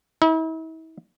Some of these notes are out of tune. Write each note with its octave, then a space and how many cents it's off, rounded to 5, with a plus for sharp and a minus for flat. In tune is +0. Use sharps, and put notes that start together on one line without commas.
E4 -40